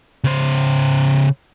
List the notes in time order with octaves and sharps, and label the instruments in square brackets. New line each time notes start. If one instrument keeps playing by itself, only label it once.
[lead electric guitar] C#3 C5